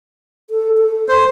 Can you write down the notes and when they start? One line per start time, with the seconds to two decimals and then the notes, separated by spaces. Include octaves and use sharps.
0.50 A4
0.77 A4
1.09 C5